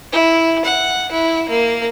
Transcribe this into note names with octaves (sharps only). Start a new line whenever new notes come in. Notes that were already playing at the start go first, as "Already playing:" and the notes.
E4
F#5
E4
A#3